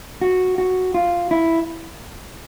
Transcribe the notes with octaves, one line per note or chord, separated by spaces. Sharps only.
F#4
F#4
F4
E4